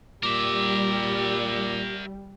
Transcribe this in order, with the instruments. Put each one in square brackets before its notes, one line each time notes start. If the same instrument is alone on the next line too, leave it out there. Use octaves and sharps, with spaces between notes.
[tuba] A#2 [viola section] G3 [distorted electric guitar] A#4 E5 [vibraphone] D6